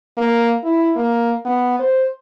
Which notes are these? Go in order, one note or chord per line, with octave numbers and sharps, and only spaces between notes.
A#3
E4
A#3
B3
C5